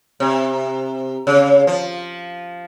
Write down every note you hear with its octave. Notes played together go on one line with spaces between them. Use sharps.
C3
C#3
F3